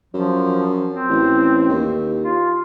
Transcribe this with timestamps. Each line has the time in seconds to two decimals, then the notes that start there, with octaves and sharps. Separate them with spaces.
0.14 F#2 F3
0.90 C4
1.09 A1
1.69 D#2
2.25 F4